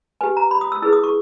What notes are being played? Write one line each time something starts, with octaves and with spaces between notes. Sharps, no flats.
G4 B4 G#5
A#5
B5
D#6
E6
E4 G#4 B4 E6
D#6
C#6